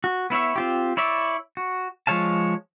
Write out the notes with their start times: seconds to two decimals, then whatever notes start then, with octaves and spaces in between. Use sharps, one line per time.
0.04 F#4
0.30 B3 E4 C#5 E5
0.56 C4 F4 G4
0.97 E4 C#5 D5 E5
1.57 F#4
2.07 F3 G#3 C#5 F5 A5